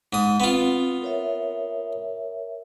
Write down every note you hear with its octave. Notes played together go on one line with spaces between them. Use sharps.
G#2 D#6
B3 C4 F4
A#4 C#5 E5